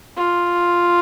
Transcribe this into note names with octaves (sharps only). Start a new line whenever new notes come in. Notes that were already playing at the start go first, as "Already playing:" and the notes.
F4